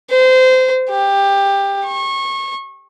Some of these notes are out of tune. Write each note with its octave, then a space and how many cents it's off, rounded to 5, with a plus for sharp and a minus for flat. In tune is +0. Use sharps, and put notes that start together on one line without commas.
C5 -25
G4 +15
C#6 -25